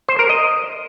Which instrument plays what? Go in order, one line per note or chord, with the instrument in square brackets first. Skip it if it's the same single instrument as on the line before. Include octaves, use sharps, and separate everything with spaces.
[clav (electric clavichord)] C5
A#4
D#5